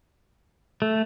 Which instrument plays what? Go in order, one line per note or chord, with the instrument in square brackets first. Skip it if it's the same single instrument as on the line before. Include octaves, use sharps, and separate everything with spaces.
[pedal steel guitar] A3